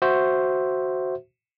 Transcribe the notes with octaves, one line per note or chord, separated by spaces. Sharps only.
F#4 C5 E5